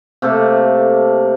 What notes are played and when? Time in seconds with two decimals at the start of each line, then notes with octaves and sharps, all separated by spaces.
0.22 C3 A3 A#3 A4